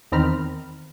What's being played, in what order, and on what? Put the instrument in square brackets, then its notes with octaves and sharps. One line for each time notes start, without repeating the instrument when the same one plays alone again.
[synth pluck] E2 D#3 C4 A#5 B5 F6